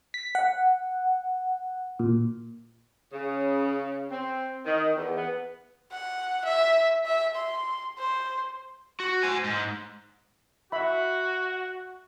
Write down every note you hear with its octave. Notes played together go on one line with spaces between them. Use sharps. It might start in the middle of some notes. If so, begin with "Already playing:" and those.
B6
F#5
A#2
C#3
C4
D#3
E2
B3
F#5
E5
E5
C6
C5
F#4
C5 G#5
G#2
F#4 E5 B5